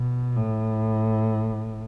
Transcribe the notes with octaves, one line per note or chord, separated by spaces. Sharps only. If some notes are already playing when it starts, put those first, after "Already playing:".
Already playing: B2
A2